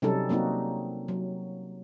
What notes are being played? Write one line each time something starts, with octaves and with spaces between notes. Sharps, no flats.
C3 F#3 G3 C#4 D#4 A4
F#3 A#3 C4 D#4 F#4
F#3